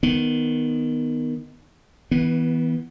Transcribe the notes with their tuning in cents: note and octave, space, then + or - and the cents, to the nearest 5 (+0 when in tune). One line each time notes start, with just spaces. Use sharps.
D#3 -5 B3 +0
E3 -25 B3 +0